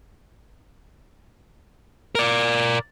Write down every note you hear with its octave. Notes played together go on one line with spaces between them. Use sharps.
A#4 D5